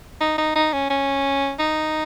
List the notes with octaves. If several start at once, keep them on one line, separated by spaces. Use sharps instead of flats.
D#4
D#4
D#4
C#4
C#4
D#4